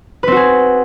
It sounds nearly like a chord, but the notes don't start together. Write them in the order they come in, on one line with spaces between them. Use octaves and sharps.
B4 C4 F#4 G#4